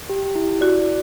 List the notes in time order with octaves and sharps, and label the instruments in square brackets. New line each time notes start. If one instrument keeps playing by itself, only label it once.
[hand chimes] G4
E4
[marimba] F#4 [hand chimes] D5